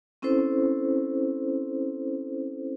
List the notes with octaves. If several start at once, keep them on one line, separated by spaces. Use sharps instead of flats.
C4 C#4 E4 A4 C5